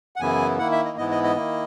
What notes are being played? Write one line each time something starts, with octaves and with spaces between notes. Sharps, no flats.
F#5
F#2 C#3 E3 B3 E4 G#5
D#3 A#3 E4 F#5
E5
D#5
G#2 E3 B3 E4 D#5
D#5
D#5
D#3 A#3 E4